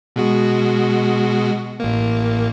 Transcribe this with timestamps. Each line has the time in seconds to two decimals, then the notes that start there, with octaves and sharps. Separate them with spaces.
0.16 B2 G#3 F#4
1.80 A1 A#3